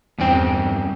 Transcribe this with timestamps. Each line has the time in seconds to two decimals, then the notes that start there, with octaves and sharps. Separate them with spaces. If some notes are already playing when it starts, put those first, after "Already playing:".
0.19 E2 G2 C4 C#4 G5